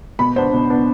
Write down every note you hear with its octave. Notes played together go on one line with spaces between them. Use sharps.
B2 B5
B3 D4 C5
B2
B3 D4